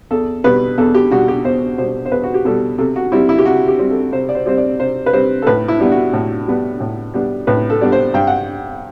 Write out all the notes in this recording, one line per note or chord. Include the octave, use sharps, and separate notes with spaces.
E2 A4
B2 G3 B4
E2 A4
G4
B2 G3 F#4
G4
E2 C5
B2 G3 C5
C5
E2 B4
F#4
G4
B2 G3 A4
C3 A4
F#4
G3 C4 E4
E4
G4
C3 F#4
G4
G3 C4
A4
C3 C5
D5
C5
G3 C4 C5
D5
C3 C5
B4
G3 C4 C5
A4
A2 B4
E4
G3 B3 D4
F#4
A2
G3 B3 D4
A2
G3 B3 D4
A2 B4
A4
G3 B3 D4 D5
C5
G2 G5
F#5